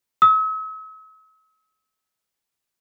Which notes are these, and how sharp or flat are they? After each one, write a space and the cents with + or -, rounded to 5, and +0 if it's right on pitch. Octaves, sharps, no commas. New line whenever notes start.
E6 -45